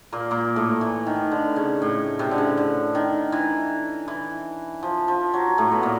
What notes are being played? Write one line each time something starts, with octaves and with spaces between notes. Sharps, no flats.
A#2 A#3
A#2 A#3
A2 A3
E3
D#3
D3
C#3
A2
C3
D3
C#3
D3
D#3
E3
E3
F3
F3
F#3
A2 A3
B3
A#2 A#3